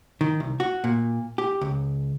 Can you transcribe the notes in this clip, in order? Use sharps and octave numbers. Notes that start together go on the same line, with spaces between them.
D#3
C2
F#4
A#2
G4
C#2